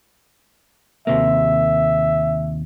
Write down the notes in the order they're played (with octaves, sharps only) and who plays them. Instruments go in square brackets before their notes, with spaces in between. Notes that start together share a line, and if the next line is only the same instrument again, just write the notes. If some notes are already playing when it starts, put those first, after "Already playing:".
[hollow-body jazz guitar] D#2 C3 A#3 [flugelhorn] E5